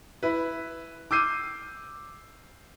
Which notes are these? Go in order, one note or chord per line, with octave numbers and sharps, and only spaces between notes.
E4 B4
D6 E6 G6 C7 D#7